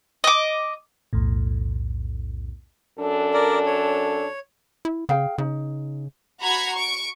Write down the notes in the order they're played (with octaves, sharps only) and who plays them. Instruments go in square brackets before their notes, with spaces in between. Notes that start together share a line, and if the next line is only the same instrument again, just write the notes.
[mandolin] D#5 D6
[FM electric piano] B1 E2 A2
[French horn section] F#2 D4 A4
[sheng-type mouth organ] A#4 D5
C#5
[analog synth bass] E4
[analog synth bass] C#3 [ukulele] G#4 F5 G5
[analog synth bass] C#3 [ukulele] D#4
[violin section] F#4 A#5 B5 G#6 C7 C#7
C#6 D7